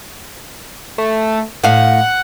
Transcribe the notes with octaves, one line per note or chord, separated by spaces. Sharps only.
A3
A2 F5 F#5